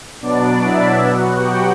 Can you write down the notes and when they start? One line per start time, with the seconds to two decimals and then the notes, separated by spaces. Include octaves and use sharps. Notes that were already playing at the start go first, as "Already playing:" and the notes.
0.21 B2 F#3 B3 D4 D5
0.64 E4 E5
1.07 B2 F#3 B3 F#4 F#5
1.36 G4 G5